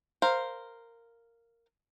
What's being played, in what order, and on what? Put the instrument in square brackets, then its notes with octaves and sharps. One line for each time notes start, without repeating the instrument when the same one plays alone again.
[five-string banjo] A#4 C5 F5